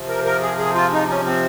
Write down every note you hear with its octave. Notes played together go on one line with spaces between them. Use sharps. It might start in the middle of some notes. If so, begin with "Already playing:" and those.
Already playing: C3 F3
A#4
A#4
G#4
G#4
F4
D#4
C#4
C4